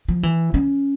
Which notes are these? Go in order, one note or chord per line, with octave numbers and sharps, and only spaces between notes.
F3
E3
C#4